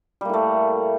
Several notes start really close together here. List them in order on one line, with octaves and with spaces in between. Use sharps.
G3 A#3 A2 A3